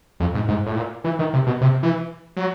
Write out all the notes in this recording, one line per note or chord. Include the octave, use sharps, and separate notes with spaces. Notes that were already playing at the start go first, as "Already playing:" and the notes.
F2
G#2
G#2
A2
A#2
E3
D#3
C3
B2
C3
E3
F#3